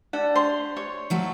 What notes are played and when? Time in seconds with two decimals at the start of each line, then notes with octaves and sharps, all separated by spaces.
0.13 D4 D5 F#5
0.35 C5 C6
0.77 C#5
1.10 F3 F#3 A3